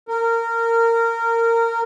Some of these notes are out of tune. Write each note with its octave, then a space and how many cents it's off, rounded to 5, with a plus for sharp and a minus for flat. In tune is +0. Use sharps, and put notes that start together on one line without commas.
A#4 -20